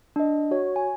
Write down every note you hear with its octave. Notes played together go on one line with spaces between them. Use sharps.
D4 D#5
F#4 C#5
G#5